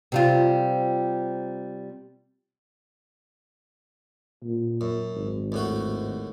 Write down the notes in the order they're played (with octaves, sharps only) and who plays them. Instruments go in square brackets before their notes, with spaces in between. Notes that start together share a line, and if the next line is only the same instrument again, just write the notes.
[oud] C3 G3 F4
[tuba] A#2
[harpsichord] F#2
[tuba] G#1
[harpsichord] D#2 A2 F#4